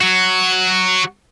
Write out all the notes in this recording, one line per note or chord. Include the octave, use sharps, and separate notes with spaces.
F#3 F#4